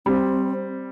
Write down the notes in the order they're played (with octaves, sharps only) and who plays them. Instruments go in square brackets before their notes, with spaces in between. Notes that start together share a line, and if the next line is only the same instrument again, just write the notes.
[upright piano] G3 [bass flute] C4